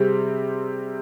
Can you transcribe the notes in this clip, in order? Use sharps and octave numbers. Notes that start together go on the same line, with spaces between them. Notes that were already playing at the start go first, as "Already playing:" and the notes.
Already playing: C3 G3 C4 G#4